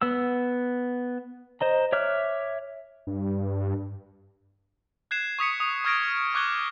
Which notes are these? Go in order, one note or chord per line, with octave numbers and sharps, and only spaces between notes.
B3 F#5 E6
C5 D#5 A#5
C#5 E5 D6 F6 F#6
G2
F#6 G#6 C7 E7
C#6 D#6 B6 C#7
D#6
C#6 F6 G#6 A#6 D7
C#6 D6 F#6 G#6 G7